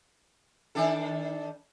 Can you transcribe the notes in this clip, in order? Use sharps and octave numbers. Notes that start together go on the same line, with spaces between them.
D#3 D4 A4